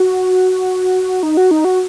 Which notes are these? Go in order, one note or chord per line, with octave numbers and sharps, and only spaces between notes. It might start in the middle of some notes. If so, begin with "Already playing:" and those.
Already playing: F#4
D#4
F#4
D#4
F#4